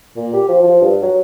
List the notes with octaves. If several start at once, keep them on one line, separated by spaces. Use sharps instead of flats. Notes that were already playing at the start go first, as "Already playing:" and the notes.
A#2
G4
F3
F3
G2
F#3